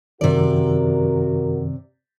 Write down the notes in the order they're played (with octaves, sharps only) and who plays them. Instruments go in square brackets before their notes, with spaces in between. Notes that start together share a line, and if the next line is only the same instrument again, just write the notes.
[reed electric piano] F#2 D#3 [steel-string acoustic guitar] C3 D5 [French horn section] F#4 A#4